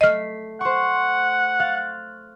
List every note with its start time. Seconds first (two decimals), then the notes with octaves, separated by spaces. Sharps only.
0.01 A3 D#5 F6 B6 C7
0.61 C5 F#5 C#6
1.60 F5 F#6 A6